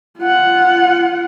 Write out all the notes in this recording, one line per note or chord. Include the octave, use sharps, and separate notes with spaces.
F4 F#5